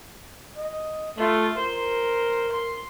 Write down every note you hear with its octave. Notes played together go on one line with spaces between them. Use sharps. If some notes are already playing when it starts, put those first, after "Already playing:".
D#5
A3 F4
A#4 C5
C6